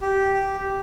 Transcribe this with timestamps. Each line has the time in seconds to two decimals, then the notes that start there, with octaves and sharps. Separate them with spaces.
0.01 G4